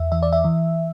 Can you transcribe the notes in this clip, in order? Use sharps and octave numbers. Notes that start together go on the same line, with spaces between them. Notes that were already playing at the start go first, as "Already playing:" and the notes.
Already playing: E2 E5
E3 E5
D5
E5
E3